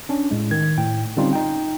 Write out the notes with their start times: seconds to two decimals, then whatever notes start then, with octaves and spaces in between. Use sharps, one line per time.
0.09 C#4 D4
0.31 A2 G#3
0.51 D#3 G#6
0.77 A2 G5
1.17 D3 G3 C4 C#4 D#4 F4
1.33 D#4 G5